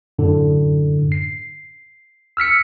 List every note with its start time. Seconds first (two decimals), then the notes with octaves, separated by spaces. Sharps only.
0.19 F#2 A2 D3
1.12 C7
2.37 E6 F6 B6 C#7